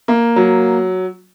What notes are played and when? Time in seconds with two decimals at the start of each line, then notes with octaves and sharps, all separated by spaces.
0.08 A#3
0.36 F#3